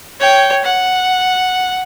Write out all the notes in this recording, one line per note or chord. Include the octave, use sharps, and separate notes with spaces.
C#5 G5
F#5